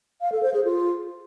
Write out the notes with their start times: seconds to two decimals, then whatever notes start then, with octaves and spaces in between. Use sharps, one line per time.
0.21 F5
0.32 A4
0.43 C5
0.54 G#4
0.65 F4